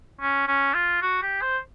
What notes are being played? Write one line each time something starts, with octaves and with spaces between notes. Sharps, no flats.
C#4
C#4
F4
F#4
G4
C5